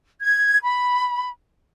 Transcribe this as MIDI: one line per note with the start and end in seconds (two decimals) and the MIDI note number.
0.20 0.58 92
0.62 1.29 83